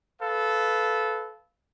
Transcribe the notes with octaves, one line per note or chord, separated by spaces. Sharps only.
A4 B4 F5